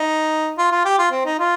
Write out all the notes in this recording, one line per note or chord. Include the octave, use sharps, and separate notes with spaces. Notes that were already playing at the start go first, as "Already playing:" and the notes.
Already playing: D#4
F4
F4
G4
F4
C4
D#4
F4